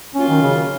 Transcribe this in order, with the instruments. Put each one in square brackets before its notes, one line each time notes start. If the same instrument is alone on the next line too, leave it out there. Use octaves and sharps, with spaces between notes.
[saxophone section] F#3 A#3 F4 [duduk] C#4
[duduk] D#3
C#3